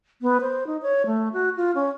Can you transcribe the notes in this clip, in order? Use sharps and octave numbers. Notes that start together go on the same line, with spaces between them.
B3
C5
D#4
C#5
A3
F#4
F4
C#4